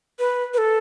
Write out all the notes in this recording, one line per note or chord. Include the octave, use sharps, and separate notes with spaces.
B4
B4
A4